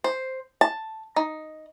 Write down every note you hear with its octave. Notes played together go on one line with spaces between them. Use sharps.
C5
A5
D#4